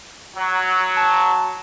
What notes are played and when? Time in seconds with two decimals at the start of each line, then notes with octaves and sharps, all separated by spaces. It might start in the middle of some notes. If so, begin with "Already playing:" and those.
0.36 F#3
0.96 A5